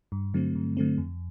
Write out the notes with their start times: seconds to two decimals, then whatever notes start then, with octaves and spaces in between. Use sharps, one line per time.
0.12 G2
0.34 D3 F#3 A3 C4
0.55 G2
0.77 D3 F#3 A3 C4
0.98 F2